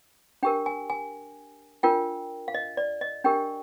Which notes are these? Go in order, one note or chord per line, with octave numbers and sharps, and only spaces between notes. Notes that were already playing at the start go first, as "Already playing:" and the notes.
D4 G4 A#4 G5
G#5
G#5
D4 F4 A#4 G5
F5
D#5
D5
D#5
D4 G4 A#4 G5